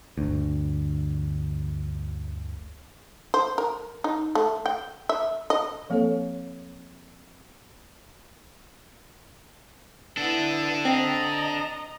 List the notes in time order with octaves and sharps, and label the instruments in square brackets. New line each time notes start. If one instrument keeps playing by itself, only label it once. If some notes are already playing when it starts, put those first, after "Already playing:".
[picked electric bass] G1 D2
[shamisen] C5
A#4
D#4
A3
G5
E5
D#5
[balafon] F3 A#3 C4 A4 C#5
[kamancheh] B3 E4 [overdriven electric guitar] D4 A4
[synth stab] C4 [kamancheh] D#5 A#5